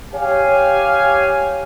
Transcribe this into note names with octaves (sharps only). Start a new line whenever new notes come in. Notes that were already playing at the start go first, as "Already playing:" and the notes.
G4 C#5 F5 G#5